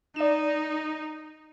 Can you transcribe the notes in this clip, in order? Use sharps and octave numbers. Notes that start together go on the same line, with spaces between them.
D#4 D5 E7